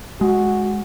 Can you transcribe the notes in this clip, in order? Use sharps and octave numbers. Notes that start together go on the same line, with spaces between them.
G#3 F#4